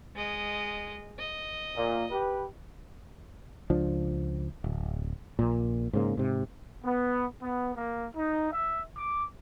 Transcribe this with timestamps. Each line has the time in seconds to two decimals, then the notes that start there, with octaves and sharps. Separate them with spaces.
0.16 G#3 D#5
1.19 D#5
1.75 A#2
2.11 G4 B4
3.70 C#2 F3 D4
4.64 D1
5.39 A#1 A#2
5.93 G#2 C#3 A#3
6.17 G#2 C3
6.85 B3
7.41 B3
7.75 A#3
8.16 D#4
8.51 E5
8.97 D6